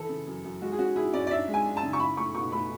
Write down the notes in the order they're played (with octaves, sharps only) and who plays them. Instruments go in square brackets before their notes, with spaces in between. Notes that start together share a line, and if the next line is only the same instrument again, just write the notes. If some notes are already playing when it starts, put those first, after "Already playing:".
Already playing: [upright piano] E3 A4
C#3
F#2
F#2
G#3 F#4
G#4
C#4 F#4
E4 G#4
C#4 D5
D5
D4 E5
G#3
G#5
D4
A5
C#3
C#6
E4 B5
A3 C#6
B2 C#6
A3 B5